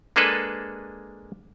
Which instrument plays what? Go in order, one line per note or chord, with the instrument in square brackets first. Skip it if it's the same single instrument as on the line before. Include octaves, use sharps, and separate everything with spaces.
[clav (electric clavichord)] G#3 A#3 D4 G#4 A4 B4